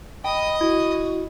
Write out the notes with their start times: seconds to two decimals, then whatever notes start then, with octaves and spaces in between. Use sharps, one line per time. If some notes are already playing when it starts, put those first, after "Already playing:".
0.24 D#5 G5 B5 D#6
0.61 E4 F#4